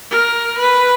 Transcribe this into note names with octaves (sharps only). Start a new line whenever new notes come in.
A#4
B4